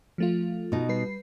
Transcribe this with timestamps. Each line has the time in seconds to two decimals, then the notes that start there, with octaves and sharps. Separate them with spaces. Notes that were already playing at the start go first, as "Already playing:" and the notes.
0.18 F3 A3 F4
0.72 B2 D#4
0.89 G3 B4 C7